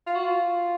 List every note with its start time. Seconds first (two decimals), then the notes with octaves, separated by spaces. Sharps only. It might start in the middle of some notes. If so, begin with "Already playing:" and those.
0.07 F4
0.15 F#4
0.24 F4